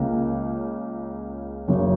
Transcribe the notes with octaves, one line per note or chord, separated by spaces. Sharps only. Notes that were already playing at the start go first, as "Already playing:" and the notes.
Already playing: C#2 C#3 A#3
F#1 F#2 C#3